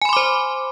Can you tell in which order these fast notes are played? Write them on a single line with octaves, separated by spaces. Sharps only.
G#5 B5 C6 D6 C5